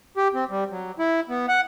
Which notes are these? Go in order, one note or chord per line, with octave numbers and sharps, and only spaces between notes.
G4
C4
G3
F#3
E4
B3
F#5